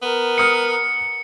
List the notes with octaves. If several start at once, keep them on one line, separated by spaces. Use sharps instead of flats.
B3 A#4
A#5 D#6 F6 C#7